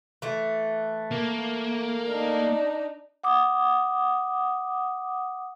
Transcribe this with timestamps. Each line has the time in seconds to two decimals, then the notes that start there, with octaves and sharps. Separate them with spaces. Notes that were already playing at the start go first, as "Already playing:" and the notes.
0.22 E3 A3
1.11 A#3
2.09 D4 D#4
3.23 F#5 D6 D#6